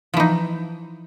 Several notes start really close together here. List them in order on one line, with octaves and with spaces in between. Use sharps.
F3 E3 D#4